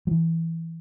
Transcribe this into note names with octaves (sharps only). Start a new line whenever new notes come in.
F#3
E3